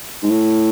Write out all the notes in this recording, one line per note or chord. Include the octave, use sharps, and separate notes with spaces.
G#2
A2